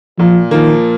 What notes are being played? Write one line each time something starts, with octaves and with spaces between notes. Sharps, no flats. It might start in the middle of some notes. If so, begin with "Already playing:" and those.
A#2 F3
D#3 F3 A#3